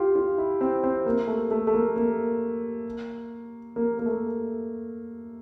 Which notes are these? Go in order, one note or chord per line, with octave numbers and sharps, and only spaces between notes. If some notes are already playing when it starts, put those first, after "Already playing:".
Already playing: F4 G4
F4
E4
C4
C4
A#3
A3
A3
A3
A#3
A#3
A#3
A#3
A3